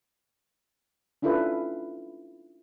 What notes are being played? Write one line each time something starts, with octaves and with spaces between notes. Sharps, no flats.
C#4 D4 E4 F4 A4 B4